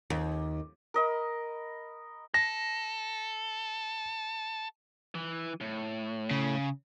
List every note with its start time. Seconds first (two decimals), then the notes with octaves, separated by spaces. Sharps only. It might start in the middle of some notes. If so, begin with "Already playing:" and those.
0.10 D#2
0.94 A#4 D#5 B5
2.34 A4 A#6
5.15 E3
5.61 A2
6.31 C#3